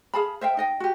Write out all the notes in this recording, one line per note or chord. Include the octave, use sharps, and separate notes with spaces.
G#4 F5 A5 B5
C5 E5 F5 G5
D#4 D#5 G5
F#4 G4